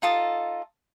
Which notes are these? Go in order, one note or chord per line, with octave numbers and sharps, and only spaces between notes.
D#4 F4 A4 D#5